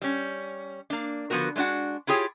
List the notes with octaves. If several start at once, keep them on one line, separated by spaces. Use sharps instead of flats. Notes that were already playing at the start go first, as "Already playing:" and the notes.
G3 C#4
A#3 D4
D3 F3 B3 C4 F#4 A#4
G#3 A3 D4 F#4 F#5
E4 F4 G4 G#4 C#5